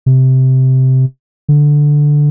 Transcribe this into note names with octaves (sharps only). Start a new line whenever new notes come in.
C3
D3